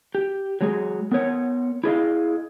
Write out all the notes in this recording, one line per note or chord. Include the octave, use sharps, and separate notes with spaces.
G4
F#3 G#3 G#4
B3 A#4 C#5 F#5
E4 G#4 D#5 F5